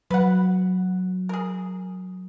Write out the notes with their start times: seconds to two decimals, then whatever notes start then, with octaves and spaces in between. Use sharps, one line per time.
0.11 F#3 B4 F#5
1.29 G#4 A#4